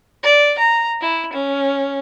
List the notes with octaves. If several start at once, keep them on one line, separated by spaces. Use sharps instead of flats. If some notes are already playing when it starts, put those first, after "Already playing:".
D5
A#5
E4
C#4